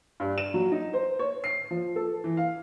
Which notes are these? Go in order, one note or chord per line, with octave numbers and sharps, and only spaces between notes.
G2
E7
F#3
D#4
C5
C#5
C7
F3
A4
E3
F5